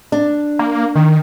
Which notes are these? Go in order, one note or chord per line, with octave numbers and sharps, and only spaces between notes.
D4
A#3
D#3